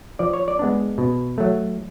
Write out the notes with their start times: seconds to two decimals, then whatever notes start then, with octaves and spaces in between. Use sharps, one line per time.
0.19 F3 D5
0.34 C#5
0.48 D5
0.59 G#3 B3 D4
0.98 B2
1.38 F#3 A3